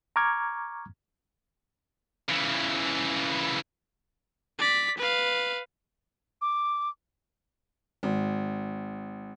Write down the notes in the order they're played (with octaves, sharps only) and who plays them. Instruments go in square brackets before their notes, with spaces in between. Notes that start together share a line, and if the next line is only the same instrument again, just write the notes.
[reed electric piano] A#5 C#6 D6 F6 G#6
[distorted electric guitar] C#3 E3
[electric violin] D5 B6
B4 F5
[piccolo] D6
[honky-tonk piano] G#1